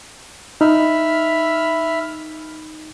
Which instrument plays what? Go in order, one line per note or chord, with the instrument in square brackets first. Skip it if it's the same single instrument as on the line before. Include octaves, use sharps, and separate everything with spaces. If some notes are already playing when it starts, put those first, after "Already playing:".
[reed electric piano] D#4 [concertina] E5 B5 F6